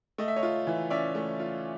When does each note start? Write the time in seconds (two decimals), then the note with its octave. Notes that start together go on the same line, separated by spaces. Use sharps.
0.18 A3 D#5
0.28 E5
0.36 C#5 D#5
0.43 F4
0.67 E3
0.90 C#4 D5 E5
1.15 A3
1.40 F4